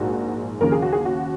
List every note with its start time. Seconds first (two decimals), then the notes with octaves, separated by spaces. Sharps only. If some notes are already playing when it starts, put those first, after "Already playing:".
Already playing: A#1 G#2 A#3 F#4
0.61 D#2 C#3 F3 A#4
0.72 G#4
0.82 F#4
0.92 G#4
1.05 F#4